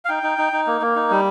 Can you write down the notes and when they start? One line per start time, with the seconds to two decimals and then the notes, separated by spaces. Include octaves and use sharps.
0.05 F5
0.09 D#4 G5
0.23 D#4
0.38 D#4
0.53 D#4
0.67 A#3
0.81 A#3
0.96 D#4
1.11 G3